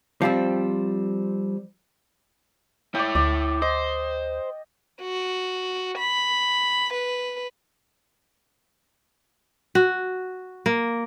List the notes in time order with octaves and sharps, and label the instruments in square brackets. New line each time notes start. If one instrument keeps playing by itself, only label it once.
[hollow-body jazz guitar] F3 G3 C4
[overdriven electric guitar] E4 C#5 [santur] D5 G5
[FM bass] D2 [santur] D5
[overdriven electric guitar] C5 [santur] D#5
[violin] F#4
B5
B4
[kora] F#4
A#3